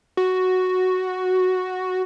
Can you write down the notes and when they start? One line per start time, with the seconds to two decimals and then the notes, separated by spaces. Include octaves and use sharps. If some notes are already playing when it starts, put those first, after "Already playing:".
0.17 F#4